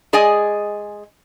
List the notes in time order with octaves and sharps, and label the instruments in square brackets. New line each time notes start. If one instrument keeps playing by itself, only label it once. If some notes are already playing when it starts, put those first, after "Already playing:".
[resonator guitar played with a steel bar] G#3 G#4 D5 D#5 G#5